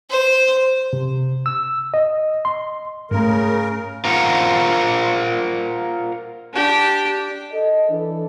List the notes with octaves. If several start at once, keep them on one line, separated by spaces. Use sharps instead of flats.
C5
C3
E6
D#5
C6
G#2 C#3 A3 A#4
F4 A#4 C5 F5 F#5
D4 G4
A4 D#5
E3 D4 A4